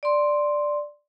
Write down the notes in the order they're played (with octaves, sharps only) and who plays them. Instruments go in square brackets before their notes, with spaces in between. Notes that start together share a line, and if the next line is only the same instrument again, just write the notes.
[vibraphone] D5 C6